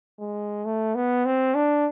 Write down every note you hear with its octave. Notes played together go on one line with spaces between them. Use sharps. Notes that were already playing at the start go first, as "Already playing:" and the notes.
G#3
A3
B3
C4
D4